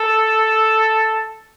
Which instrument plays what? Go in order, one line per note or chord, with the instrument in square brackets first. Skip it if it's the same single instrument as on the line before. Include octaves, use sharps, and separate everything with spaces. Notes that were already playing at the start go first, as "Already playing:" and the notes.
Already playing: [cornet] A4